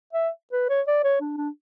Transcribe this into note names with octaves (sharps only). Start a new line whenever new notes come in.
E5
B4
C#5
D5
C#5
D4
D4